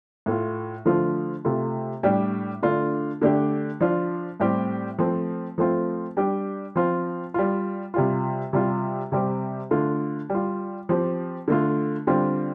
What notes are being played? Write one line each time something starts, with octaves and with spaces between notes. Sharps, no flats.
A2 A3 F4
D3 F3 A3 F4
C3 A3 F4
A2 G3 D4 G4
D3 A3 D4 F4
D3 A3 D4 G4
F3 D4 F4
A2 G3 C4 G4
F3 A3 C4
F3 A3 C4 F4
G3 D4 G4
F3 C4 F4
G3 F4
C3 G3 F4
C3 G3 F4
C3 G3 C4 G4
D3 A3 F4
G3
F4
F3 C4 G4
D3 A3 F4
D3 G3 C4 F4